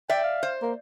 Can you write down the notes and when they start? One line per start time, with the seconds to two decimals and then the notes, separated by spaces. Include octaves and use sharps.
0.10 D5 E5 G5
0.24 F5
0.43 C5
0.62 A#3